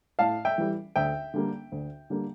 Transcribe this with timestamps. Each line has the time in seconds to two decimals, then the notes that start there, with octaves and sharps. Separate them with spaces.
0.19 A2 F5 A5
0.45 E5 G5
0.58 E3 G3
0.96 D2 E5 G5
1.34 D3 G3 A#3
1.72 D2
2.10 D3 G3 A#3